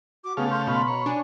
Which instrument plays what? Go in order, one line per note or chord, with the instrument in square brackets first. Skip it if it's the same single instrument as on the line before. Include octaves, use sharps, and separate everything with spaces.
[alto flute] F#4 [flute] D6
[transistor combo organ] C#3 A3 F5 [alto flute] B3 [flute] G#4
[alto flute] C6 [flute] G6
[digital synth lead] B2 [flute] B5
[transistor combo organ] C#5 [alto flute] A#5
[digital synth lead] D4 [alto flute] G#5